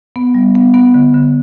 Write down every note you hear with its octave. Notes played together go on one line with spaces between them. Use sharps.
B3
G3
B3
B3
D3
D3